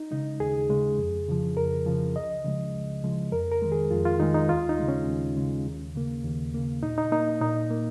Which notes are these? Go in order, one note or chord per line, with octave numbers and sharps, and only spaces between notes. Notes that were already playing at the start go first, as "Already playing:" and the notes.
Already playing: D#4
C#3 G#3 D#4
D#2 G#4
C#3 G#3
F2
C#3 F3
F2 A#4
C#3 F3
C#2 D#5
C#3 F3 G#3
C#2
C#3 F3 G#3
F2 A#4
A#4
D#3 G#3
G#4
F2 F4
F4
D#3 G#3 D#4
D#4
D#2 F4
D#4
C#3 G#3
C#4
D#2
C#3 G#3
D#2
C#3 A#3
D#2
C#3 A#3
A#2 D#4
D#4
A#3 D#4
A#2 D#4
A#3